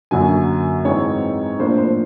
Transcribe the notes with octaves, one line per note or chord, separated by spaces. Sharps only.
F#2 D3 F#3 A#3 G#5
G#2 E3 G#3 C4 C#5
A2 F3 A#3 D4 C5
C5